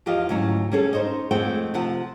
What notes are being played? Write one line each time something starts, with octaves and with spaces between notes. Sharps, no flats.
E2 F3 F4 G4 D#5 F5
D2 G#2 F#3 C#4
G3 C#4 G#4 A4
D#4 C5 C#5 D#5
F2 G#3 A3 C4 F#5 G5
C3 F3 F#5 A5